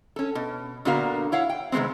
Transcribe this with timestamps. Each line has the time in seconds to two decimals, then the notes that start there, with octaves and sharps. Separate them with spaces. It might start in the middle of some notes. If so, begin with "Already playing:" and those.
0.16 C#4 A4
0.35 B2
0.85 A#2 D3 B3 F#4 A#4 F5
1.32 E4 C#5 F5 F#5
1.50 G5
1.72 C3 D#3 G#3 B3 C4